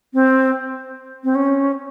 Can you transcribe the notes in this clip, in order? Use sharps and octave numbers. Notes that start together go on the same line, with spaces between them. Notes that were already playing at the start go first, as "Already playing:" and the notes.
C4
C4
C#4